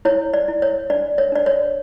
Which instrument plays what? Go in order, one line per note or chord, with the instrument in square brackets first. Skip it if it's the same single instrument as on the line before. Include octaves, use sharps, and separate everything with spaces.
[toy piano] E4 C#5
D5
E4
C#5
D4 D5
C#5
D4 D5
C#5